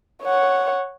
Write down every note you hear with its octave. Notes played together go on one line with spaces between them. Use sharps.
C#5 F#5